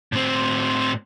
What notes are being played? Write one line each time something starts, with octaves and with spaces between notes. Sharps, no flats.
A2 C4